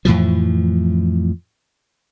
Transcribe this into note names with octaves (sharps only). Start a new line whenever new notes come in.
F2 A2 E3 F3